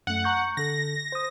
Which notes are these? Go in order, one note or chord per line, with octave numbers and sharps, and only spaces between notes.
F#2 A3 F#5
A#5 C#6 G6
D3 A4 A#6
C5 D#6